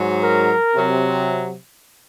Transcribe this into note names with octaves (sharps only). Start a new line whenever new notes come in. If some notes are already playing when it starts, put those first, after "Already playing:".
Already playing: G#2 F#3
A#4
C3 F#3